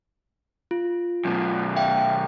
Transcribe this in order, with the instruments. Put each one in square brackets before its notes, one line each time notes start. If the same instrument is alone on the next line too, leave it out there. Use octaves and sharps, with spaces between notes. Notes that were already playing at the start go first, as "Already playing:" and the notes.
[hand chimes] F4
[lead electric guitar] F#2 B2
[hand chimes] E5 F5 G5